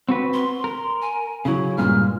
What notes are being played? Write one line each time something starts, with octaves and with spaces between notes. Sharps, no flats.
C4 F#4 B4
C6
A#4
G#5
C#3 F#3 E4
G2 A#2 G#3 F6